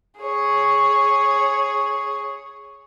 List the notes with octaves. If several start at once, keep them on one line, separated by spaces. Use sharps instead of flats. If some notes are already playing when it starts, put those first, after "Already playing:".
G#4 C#5